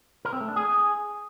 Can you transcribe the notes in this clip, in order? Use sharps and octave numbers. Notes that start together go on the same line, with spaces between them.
A#4
C4
A3
D4
G#4